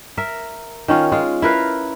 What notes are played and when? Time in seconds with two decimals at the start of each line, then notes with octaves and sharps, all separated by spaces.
0.18 A#4 E5
0.88 D#3 C#4 F4
1.12 G#3 F4
1.42 E4 A#4 B4 F5